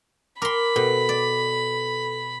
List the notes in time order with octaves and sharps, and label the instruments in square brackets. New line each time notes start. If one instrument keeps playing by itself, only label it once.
[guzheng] A#4 C6 [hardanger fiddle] B5 [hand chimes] D6
[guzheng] B2 [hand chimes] A4
[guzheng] D5